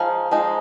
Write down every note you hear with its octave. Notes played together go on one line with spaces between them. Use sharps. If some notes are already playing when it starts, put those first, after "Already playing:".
Already playing: F3 G#3 D#4 F5
F3 G#3 D#4